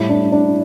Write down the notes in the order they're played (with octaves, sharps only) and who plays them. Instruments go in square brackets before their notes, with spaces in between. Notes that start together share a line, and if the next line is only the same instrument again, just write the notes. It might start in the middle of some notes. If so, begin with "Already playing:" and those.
Already playing: [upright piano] A2 G3 E4
D4
D4